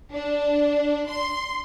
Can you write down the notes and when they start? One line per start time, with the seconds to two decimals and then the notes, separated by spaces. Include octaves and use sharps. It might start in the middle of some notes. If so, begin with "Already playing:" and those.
0.13 D4
1.10 C6